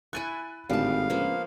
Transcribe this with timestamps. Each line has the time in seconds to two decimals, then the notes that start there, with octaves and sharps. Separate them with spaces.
0.13 E4 G#5 C#6 F#6 A6 D#7
0.70 G#1 A2 D3 G3 G#3 F5 A5
1.10 C#2 F3 A#3 B3